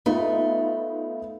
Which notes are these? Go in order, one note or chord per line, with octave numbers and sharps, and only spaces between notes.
A3 B3 D#4 F4